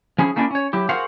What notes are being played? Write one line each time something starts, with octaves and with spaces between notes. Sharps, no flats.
F3 C#4 E4 G#4
A3 A#3 C#4 D4 E4 D5
C#4 C#5
F#3 E4 G4
F#4 G#4 A#4 C5 F5 F#5